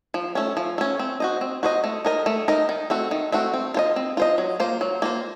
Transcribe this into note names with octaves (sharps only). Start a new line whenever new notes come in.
F3
A3 C#4
F3
A3 C#4
C4
F#4 C5 D#5
C4
F#4 C5 D#5
A3
D#4 A#4 D#5
A3
D#4 A#4 D#5
D#3
A3 C4 F#4
D#3
A3 C4 F#4
C4
F4 C5 D#5
C4
F4 C5 D#5
F#3
A#3 F4 C5
F#3
A#3 F4 C5